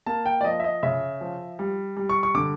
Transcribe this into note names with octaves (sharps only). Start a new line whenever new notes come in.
A#3 A5
G5
D5
F3 D#5
E5
D#5
C#3 E5
F3
G3
G3
C#6
C#6
D3 D6